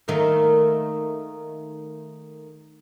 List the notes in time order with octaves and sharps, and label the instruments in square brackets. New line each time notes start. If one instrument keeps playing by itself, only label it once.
[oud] D#3 A3 A#3